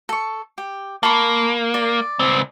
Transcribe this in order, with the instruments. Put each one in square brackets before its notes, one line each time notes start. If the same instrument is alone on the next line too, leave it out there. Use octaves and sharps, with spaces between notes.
[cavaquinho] A4 C#6
G4
[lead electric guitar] A#3 [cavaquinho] A5 B5 C#6
[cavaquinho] D5
[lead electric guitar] C#2 C4